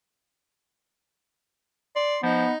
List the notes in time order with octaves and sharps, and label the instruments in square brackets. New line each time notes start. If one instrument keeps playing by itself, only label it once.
[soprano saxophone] D5 [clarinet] C6
[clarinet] F3 [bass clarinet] B3 [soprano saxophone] D#4